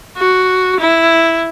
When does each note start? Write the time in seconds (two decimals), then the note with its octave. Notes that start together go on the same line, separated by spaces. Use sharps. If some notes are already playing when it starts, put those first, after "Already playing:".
0.18 F#4
0.80 E4